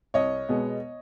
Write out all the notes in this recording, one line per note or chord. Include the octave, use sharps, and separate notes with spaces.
C2 C#5 D#5
B2 G#3 B3